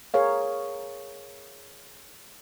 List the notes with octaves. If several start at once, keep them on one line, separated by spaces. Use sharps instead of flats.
G#4 A#4 C#5 F5